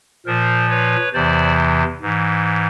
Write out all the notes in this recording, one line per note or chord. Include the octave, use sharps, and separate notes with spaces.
A#2 F3 A#4 C5
B4 C#5
E2 C3 E3 C5 D5
G#2 E3